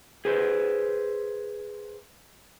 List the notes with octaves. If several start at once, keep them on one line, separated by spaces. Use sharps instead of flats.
G#4 B4 C5